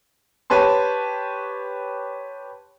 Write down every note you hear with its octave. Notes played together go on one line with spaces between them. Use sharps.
G4 B4 C#5 A5 C6